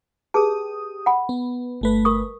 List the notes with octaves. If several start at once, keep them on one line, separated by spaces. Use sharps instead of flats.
G4 G#4 B4 A5 D#6
F#5 B5
B3
G1 A3 B4
A#4 C#6 D#6